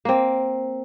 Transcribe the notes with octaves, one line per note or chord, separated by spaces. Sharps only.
A#3 C4